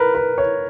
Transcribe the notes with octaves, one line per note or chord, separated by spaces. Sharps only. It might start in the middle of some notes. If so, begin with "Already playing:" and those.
Already playing: A#4 B4
B4
C#5